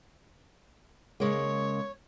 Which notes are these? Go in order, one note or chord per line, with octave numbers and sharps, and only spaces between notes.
C#3 G#3 A#3 C#5